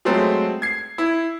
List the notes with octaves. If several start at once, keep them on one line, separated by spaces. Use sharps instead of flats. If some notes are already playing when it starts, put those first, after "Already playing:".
F#3 G#3 A3 C4
G#6 C7
E4